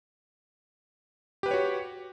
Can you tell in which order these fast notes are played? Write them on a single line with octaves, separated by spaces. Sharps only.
G4 B4 G5 C#5 F#4